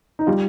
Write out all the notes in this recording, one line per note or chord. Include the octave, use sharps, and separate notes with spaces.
D#4
G3 F4